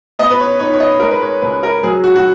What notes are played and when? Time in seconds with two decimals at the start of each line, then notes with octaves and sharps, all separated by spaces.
0.19 B3 D#5
0.31 B4
0.40 C#5
0.59 D#4 C#5
0.73 C#5
0.80 D#5
1.00 G#3 A#4
1.11 B4
1.22 C#5
1.42 C#2 B4
1.63 A#4
1.83 F#3 G#4
2.04 F#4
2.16 F#4